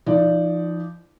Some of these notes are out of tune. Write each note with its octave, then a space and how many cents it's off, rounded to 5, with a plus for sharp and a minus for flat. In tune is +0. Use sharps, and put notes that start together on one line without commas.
F3 -30 D#4 +0 D5 +0